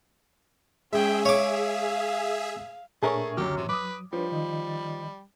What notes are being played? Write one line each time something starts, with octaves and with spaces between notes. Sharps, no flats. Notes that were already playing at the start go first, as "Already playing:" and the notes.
G#3 C#4 G#4 E5 G5
C#5 F5 D6
A#2 A3 D4 G#4 A#4 C#5 E5
C#2 F#2 D3 F#3 G4 F6
A2 C3 E3
F#3 B4 D6 D#6
F3 G3 D4 B4 C#5
D#3 D#5